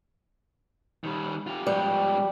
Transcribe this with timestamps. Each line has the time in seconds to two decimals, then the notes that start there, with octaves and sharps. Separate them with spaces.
1.04 D#3 G3
1.47 F4 G4
1.67 G#2 F3 G3